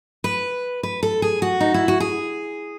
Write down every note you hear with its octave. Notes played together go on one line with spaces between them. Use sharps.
B4
B4
A4
G#4
F#4
D#4
E4
F#4
G#4